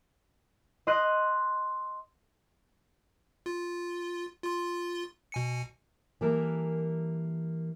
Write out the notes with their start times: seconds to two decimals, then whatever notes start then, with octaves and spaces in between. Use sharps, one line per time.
0.87 D#5 C6 D#6 F#6 D#7
3.46 F4
4.43 F4 C6
5.32 B2 G#5 C#7
6.21 E3 G3 A#3 A4 A#4